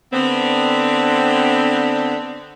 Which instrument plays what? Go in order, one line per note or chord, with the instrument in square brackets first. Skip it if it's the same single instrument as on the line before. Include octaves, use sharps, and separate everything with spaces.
[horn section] D3 B3 C4